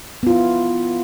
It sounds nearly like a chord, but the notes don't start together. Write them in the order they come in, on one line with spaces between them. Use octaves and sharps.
B3 F4 E4